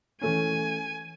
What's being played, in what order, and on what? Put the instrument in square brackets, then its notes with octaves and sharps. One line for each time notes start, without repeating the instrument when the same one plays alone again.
[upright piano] E3 A3 C#4 [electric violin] G#5